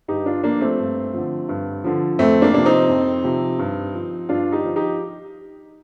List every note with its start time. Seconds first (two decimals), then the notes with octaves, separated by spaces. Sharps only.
0.08 G2 D#4 G4
0.26 D4 F4
0.44 F3 A#3 D4
0.61 A3 C4
0.79 G2
1.14 D3 F3
1.49 G2
1.84 D3 F3
2.18 F2 A3 C4
2.42 A#3 D4
2.54 C3 F3 D4
2.65 C4 D#4
2.89 F2
3.24 C3 F3
3.59 G2
3.94 F3
4.29 G2 D4 F4
4.52 D#4 G4
4.65 F3
4.76 D#4 G4